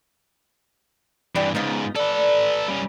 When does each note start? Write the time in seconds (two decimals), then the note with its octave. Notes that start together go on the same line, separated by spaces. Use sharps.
1.36 G2 E3 D4 G4 G5
1.55 G#2 C#3 B3 D#4 F4
1.96 A4 B4 D5
2.68 G3 C#4